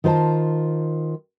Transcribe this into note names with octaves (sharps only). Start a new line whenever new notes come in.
D#3 F4 C5 A5